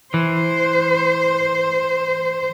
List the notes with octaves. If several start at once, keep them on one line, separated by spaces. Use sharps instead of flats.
E3 C5